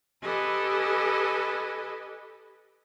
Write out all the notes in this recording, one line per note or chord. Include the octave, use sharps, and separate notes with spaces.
G4 A4 B4 D#5 G#5